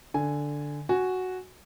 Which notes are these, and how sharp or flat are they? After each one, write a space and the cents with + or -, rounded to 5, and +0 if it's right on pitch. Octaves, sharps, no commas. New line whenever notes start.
D3 +0 G#5 +0
F#4 +0 G#5 +0